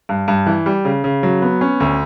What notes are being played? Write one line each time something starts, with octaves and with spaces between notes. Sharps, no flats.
G2
G2
E3
G3
C#3
C#3
F#3
B3
C#4
D2